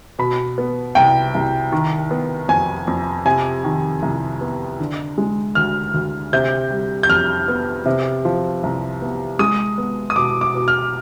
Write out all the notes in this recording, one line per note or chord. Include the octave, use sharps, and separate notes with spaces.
B2 B5
B3
C2 G5
C2
D#3
B3
F2 G#5
F2
C3 G#5
D#3
C2
B3
D3
G#3
D2 F6
D2
C3 G6
G3
G6
F2 F6
B3
C3
F3
C2
B3
G#3 D#6
B3
D#6
B2 D6
D6
B2
F6